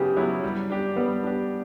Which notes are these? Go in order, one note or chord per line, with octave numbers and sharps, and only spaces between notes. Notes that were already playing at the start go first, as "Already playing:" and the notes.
Already playing: C#3 F#3 B3 E4 G4
F#3 B3 E4
G3
D4 G4
G3 B3
D4 G4